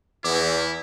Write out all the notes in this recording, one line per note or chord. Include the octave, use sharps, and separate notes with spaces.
E2 E4 D6